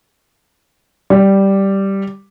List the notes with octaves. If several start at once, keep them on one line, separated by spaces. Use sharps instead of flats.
G3